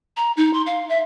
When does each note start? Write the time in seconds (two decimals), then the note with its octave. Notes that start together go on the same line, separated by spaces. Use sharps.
0.17 A#5
0.37 D#4
0.53 C6
0.66 F5
0.89 E5